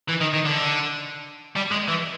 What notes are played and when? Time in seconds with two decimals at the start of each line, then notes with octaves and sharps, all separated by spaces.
0.09 E3
0.21 D#3
0.34 D#3
0.46 D3
1.56 G3
1.71 G#3
1.88 E3